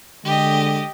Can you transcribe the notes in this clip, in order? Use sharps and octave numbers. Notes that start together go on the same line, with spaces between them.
D3 G#3 G4 D#5